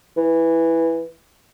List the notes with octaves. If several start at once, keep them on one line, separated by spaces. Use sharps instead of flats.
E3